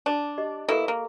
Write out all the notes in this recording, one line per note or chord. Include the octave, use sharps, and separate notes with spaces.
D4 A5
G4 D#5
B2 A#3 E4 A4 C#6
A#3